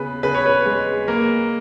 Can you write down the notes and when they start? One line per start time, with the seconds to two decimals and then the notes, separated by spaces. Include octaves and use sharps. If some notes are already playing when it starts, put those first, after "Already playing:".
Already playing: C#3 B3 B4
0.23 C#3 B4
0.35 C#5
0.46 B4
0.66 G#3
1.08 A#3 A#4